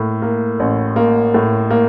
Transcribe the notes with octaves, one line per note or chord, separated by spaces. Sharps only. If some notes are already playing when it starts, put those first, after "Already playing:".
Already playing: A2 A#3
A#3
A1
A#3
A2
A#3